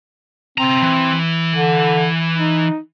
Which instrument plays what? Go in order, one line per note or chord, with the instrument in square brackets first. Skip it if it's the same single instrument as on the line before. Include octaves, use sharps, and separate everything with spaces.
[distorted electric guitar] C3 A#5 [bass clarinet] C4
[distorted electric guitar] E3
[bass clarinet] D3
D#4